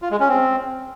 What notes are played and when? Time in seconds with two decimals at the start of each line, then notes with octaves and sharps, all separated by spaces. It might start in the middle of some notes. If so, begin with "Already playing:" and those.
0.02 F4
0.11 G#3
0.20 C#4
0.29 C4